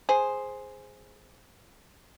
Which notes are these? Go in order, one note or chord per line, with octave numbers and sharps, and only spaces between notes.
G#4 C5